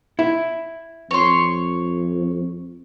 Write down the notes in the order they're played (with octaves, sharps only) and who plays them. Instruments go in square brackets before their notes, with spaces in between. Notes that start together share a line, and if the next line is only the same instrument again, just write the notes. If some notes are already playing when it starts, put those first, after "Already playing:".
[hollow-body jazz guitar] E4
[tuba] F2 [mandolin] C#5 C6